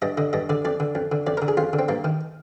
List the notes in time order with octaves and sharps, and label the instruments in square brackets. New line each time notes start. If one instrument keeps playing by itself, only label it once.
[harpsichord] G2 D#5
D3 D#5
G2 D#5
D3 D5
F2 D5
D3
F2
D3
F2 D5
D3 A#4
G#4
F2 F4
D3
C4
G2 A#3
D#3